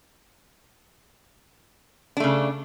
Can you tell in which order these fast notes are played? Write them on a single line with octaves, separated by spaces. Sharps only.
D4 A3 C#3